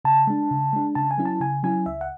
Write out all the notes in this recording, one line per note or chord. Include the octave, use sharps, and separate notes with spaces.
C#3 A5
G#3 D4
C#3
G#3 D4
C#3 A5
G#5
F#3 C#4 E4
A5
C#3 G#5
F#3 C#4 E4 G#5
C#2 E5
F#5